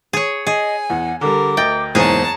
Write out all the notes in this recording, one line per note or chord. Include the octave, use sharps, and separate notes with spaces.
G#4 C#5
G#4 D#5 G#5
E2 F#5
D3 G3 A#4 D6
D2 D#5 G5 A6
F#1 E2 G#2 G#4 C5 C#5 A5 A#5